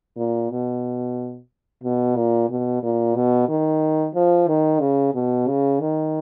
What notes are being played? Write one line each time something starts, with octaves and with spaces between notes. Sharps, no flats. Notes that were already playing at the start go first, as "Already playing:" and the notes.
A#2
B2
B2
A#2
B2
A#2
B2
D#3
F3
D#3
C#3
B2
C#3
D#3